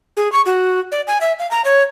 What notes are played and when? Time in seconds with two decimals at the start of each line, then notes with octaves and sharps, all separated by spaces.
0.17 G#4
0.32 C#6
0.46 F#4
0.92 D5
1.07 G#5
1.21 E5
1.39 F5
1.51 A#5
1.65 C#5